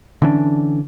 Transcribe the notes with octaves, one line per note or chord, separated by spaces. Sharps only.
D3 E3 C#4 D4